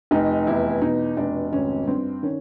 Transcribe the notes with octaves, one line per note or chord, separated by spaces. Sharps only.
F1 D#4
E2 E4
B2 D#4
F1 D4
G#1 C#4
G2 C4
D#3 C#4